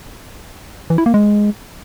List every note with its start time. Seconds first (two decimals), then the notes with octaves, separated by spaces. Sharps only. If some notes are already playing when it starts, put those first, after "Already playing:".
0.90 E3
0.98 E4
1.06 A#3
1.14 G#3